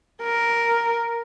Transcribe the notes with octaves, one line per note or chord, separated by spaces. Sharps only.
A#4